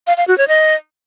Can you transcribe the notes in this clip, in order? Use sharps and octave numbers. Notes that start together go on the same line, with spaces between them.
F5
F5
F#4
C#5
D#5